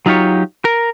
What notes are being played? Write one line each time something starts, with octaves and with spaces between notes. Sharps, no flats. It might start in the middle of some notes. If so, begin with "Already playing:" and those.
F#3 D#4 F4 G4 C#5
A#4